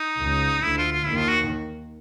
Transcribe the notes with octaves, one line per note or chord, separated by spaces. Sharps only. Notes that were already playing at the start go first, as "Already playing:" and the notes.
Already playing: D#4
C#2 C#3
D2 D3 E4
F4
F4
D#2 D#3 E4
F4
F#4